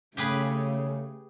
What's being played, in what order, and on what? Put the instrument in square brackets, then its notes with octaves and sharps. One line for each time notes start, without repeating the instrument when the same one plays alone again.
[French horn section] C#3 [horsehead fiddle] A3 [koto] G4 G#4 B4